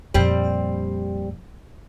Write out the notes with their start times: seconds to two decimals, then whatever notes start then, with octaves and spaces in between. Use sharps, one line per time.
0.14 F2 A#2 G3 C4